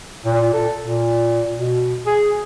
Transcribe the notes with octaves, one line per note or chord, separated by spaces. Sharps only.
A#2
A4
A#2
B2
G#4